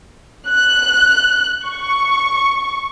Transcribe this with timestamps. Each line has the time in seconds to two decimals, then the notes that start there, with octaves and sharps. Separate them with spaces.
0.50 F#6
1.67 C#6